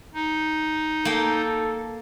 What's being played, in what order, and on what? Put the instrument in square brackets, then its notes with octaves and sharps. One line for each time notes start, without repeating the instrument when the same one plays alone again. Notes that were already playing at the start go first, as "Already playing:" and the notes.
[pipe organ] D#4
[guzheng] A#3 G5 [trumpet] A4